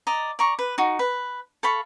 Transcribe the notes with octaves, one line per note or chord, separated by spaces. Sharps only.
D5 D#5 A#5
D5 A#5 C#6
B4
D#4 F#4
B4
A4 F5 B5 C#6